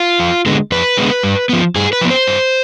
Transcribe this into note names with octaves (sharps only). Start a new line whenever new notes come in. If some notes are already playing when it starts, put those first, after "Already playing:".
Already playing: F4
F2
D3 G#3 B3
F2 B4
D3 G#3 B3
G2
F3 B3
G2 G#4
B4
F3 B3
C5
G2